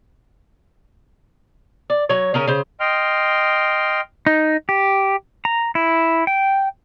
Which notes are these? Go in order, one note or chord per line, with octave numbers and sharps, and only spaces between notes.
D5
F#3 C#5
C#3 C#4 A#4
C#3 C5
D#5 G5 C6 F6
D#4
G4
A#5
E4
G5